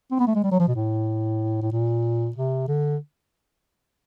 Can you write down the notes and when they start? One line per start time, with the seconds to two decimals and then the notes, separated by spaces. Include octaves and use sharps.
0.11 C4
0.19 B3
0.27 A3
0.35 G#3
0.43 G3
0.52 F#3
0.59 F3
0.67 B2
0.75 A2
1.62 A2
1.72 A#2
2.36 C3
2.68 D3